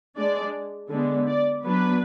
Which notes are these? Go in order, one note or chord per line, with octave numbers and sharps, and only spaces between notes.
G#3 D4 D5
D3 G#3 B3 D4
D5
F#3 B3 D4 B4